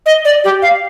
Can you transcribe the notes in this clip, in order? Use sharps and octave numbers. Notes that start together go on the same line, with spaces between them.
D#5
D5
G4
F5